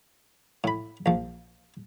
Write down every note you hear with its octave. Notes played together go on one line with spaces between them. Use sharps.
A2 B5
A#1 F3